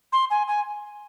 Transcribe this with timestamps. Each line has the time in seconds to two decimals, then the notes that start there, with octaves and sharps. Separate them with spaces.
0.12 C6
0.30 G#5
0.48 G#5